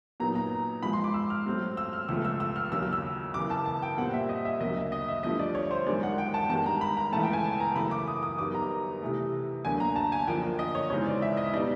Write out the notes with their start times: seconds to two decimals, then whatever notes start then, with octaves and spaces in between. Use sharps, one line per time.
0.20 A#2 F#3 B3 D#4 A#5
0.35 A#5
0.83 G#2 F3 G#3 B5
0.93 C6
1.04 D6
1.14 E6
1.30 F6
1.46 A2 F#3 A3 C4
1.77 E6
1.93 F6
2.08 C#2 C#3 F3 A3 E6
2.25 E6
2.40 E6
2.56 F6
2.72 D#2 C#3 F#3 E6
2.83 E6
2.93 E6
3.34 F#2 C#3 E3 D6
3.50 A5
3.66 A5
3.82 G5
3.98 A#2 G3 C4 F#5
4.14 E5
4.29 D#5
4.45 E5
4.60 D2 C#3 F#3 A#3 D#5
4.76 E5
4.92 D#5
5.08 E5
5.23 G2 D3 F3 A3 D#5
5.39 D5
5.55 C#5
5.71 C5
5.87 F#2 D#3 G#3 D5
6.03 F#5
6.18 G5
6.34 A5
6.50 G2 D#3 G#3 A5
6.66 A#5
6.81 B5
6.97 A#5
7.12 C#2 C#3 E3 A3 A5
7.23 G5
7.33 G#5
7.44 A5
7.60 A#5
7.75 F#2 C#3 E3 A3 B5
7.91 D6
8.08 D#6
8.23 D#6
8.38 F#2 D#3 G3 B3 D6
8.55 A#5
9.02 C3 E3 A3
9.65 D2 D3 F#3 A#3 D4 G#5
9.80 A#5
9.96 A5
10.12 G#5
10.27 F#2 D3 F3 A#3 D4 G5
10.59 D#5
10.75 C#5
10.90 C#3 E3 G#3 C4 D#4 C#5
11.06 D5
11.22 E5
11.37 D#5
11.54 B2 G3 B3 D#4 D5